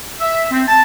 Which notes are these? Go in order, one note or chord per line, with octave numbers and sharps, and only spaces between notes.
E5
C4
A5